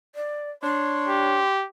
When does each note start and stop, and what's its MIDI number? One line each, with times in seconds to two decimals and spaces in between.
0.15 0.51 74
0.63 1.45 62
0.63 1.45 73
0.63 1.51 84
1.08 1.66 67